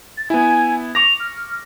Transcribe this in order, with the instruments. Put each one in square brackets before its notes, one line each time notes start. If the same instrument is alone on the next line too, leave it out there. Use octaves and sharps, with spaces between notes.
[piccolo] A6
[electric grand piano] B3 E4 [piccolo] G#5
[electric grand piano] C#6 D6 A#6 [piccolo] F7
[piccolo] F6